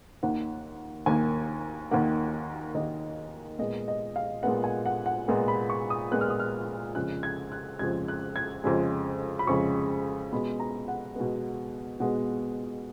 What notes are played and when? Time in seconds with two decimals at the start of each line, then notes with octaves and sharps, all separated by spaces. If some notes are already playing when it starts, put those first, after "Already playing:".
0.23 D#2 D#3 A#3 F#5
1.06 D#2 D#3 A#3 G#5
1.91 D#2 D#3 A#3 F#5
2.75 D#2 D#3 A#3 D#5
3.59 A#2 G#3 B3 D#5
3.88 D#5
4.16 F5
4.43 A#2 G#3 B3 F#5
4.64 G#5
4.86 F#5
5.06 F#5
5.28 A#2 G#3 B3
5.48 B5
5.70 C#6
5.90 D#6
6.11 A#2 G#3 B3 F#6
6.21 F6
6.30 D#6
6.40 F6
6.95 F2 C#3 G#3 F#6
7.23 G#6
7.52 F#6
7.79 F2 C#3 G#3 G#6
8.08 F#6
8.36 G#6
8.64 F2 C#3 G#3
9.39 B5
9.47 F2 C#3 G#3 C#6
10.33 B2 G#3 B3 B5
10.60 A#5
10.88 F#5
11.16 B2 G#3 B3
12.00 B2 G#3 B3 F#5